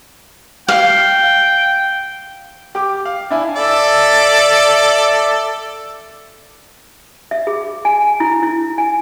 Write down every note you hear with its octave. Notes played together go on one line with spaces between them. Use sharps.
F5 G5
G4 D6
F5
D4 E4 G#5
A4 D5 E5
E5
G#4
G#5
E4
E4
G#5